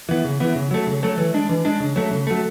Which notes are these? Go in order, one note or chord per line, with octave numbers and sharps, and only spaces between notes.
E3 B3
C#3
E3 B3
C#3
F#3 A3
C#3
F#3 A3
E3
G#3 D4
E3
G#3 D4
C#3
F#3 A3
C#3
F#3 A3